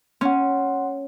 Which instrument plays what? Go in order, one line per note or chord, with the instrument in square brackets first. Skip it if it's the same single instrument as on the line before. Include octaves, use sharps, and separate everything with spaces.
[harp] C#4 [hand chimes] F#5 C6